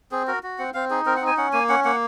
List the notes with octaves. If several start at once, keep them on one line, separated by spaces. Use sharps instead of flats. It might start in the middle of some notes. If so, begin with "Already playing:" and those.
C4 G#4
F#4 A#4
F#4
C4 F#5
C4 F5
D#4 G#4
C4 A#4
F#5
D#4
G#5
C#4 F#5
A#3 G#5
C#4 F#5
A#3 F#5